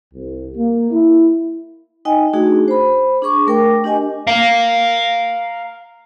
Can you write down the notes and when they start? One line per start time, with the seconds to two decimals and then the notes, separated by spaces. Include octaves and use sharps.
0.14 C2
0.55 A#3
0.91 E4
2.05 D#4 D#5 G5 G#5
2.33 A3 D4 D#4 F#4 G#4
2.68 C5 B5
3.22 D4 G#4 C#6 D6
3.47 A3 A#4 G5 D6
3.84 D4 G4 D#5 G#5
4.27 F5 A#5